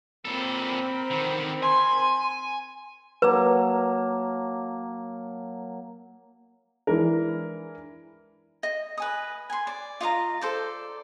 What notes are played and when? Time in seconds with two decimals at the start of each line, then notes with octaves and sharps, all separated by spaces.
0.25 A#2 C4 A4 A#4 B5
1.10 D3 D#3
1.63 G#5 C6
3.22 F#3 A#3 B4 A5
6.87 E3 G#3 D4 E4 A#4
8.63 D#5
8.98 B4 G#5 D#6
9.50 G#5 C6
9.67 D5
10.01 F4 D#5 F5 A#5
10.41 A4 C5 D5